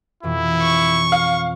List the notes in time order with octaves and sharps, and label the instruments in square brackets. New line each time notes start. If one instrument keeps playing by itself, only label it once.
[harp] F2 B2 E3 [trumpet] E4
[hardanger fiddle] C#6
[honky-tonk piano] F5